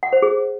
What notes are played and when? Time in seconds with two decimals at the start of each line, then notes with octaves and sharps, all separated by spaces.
0.03 F#5
0.13 C5
0.22 G#4